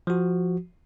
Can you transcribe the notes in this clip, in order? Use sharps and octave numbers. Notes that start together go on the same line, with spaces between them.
F3 F#4